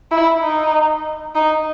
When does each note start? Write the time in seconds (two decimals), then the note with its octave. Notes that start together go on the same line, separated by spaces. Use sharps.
0.11 E4
0.43 D#4
1.35 D#4